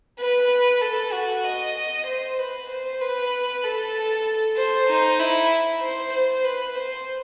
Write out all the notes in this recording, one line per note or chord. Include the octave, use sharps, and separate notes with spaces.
B4
A4
F#4
D#5
C5
B4
C5
B4
A4
C5
D#4
E4
C5
C5
B4
C5